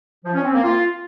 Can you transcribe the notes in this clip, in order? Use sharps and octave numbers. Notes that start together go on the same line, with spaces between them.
F3
C#4
C4
A#3
F4